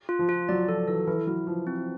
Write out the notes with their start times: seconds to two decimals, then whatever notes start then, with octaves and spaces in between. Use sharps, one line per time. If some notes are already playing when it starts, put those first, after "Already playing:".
0.09 F4
0.19 F3
0.29 F4
0.49 F#3 D5
0.68 F3 A4
0.88 E3 A4
1.07 E3 E4
1.27 F#3 E4
1.47 F3 E4
1.67 C4